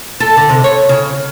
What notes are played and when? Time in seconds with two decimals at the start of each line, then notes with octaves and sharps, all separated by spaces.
0.20 A4
0.37 D3
0.49 C3
0.64 C#5
0.89 C#3